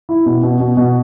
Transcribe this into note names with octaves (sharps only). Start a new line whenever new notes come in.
E4
B2
B2
B2
B2